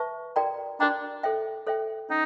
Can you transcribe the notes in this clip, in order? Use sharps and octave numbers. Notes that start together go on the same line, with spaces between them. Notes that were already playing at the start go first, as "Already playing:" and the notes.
Already playing: B4 E5 A5 C#6
F#4 A#4 D5 G5 A#5
D4 F#4 A#4 D5 G5 A#5
A4 C5 E5 G5
A4 C5 E5 G5
C#4 D#4